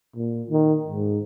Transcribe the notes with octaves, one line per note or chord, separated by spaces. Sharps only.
A#2
D#3
G#2